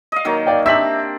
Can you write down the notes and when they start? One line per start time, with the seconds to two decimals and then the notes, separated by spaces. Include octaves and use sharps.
0.12 D#5 F5
0.25 D#3 F#3 A#3
0.47 D5 F5 G5
0.66 C4 D4 G4 E5 B6 F#7